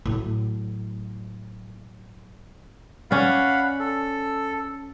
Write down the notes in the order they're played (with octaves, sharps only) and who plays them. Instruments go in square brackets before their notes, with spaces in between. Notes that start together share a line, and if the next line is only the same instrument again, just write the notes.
[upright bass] A2 F#3
[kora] C#4 D5 [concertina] F5 F#5 B5
[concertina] A4